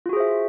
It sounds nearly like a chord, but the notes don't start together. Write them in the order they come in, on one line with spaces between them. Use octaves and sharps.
F4 F#4 G#4 C5 E5